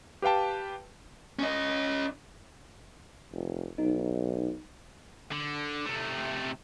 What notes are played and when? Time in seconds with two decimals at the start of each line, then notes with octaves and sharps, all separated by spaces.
0.22 G4 B4 F5 G5 A5
1.39 C#4 D#5
3.32 F1
3.78 B1 D#4
5.32 D3
5.86 C3 A3